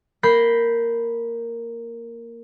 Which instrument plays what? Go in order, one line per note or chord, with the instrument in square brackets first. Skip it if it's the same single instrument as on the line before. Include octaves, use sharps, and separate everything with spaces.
[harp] A#3 B5 G6 A#6 C7